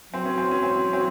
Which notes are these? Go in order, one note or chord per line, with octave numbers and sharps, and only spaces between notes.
F#3 C4
C#4
C4
C#4
C4
C4